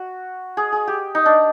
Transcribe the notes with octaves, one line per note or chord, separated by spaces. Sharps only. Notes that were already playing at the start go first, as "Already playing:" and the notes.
Already playing: F#4
G#4
G#4
G4
D#4
D4